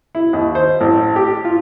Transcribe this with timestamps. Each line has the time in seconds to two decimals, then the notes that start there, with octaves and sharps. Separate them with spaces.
0.15 E4
0.33 D#2
0.55 C5
0.81 A1
1.16 G4
1.45 F4